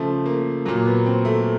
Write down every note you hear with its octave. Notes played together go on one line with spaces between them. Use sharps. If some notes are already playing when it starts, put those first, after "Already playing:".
Already playing: C#3 F3 A3
A#3
A#2 F#3 A#3
B3
C4
A3